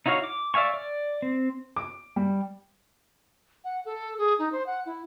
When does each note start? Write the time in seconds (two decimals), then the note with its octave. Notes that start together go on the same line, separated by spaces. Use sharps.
0.06 D#4 E4 F#4 C#5 F5
0.24 D6
0.54 D5 E5 F5 G#5 C#6
0.74 D5
1.22 C4
1.76 D6
2.16 G3
3.64 F#5
3.85 A4
4.18 G#4
4.39 D#4
4.52 C5
4.67 F#5
4.86 E4